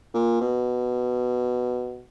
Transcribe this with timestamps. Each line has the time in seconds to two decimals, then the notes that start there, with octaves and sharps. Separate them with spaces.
0.14 A#2
0.41 B2